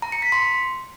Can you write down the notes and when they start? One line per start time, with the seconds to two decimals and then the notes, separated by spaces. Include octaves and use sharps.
0.02 A#5
0.12 C#7
0.22 B6
0.32 C6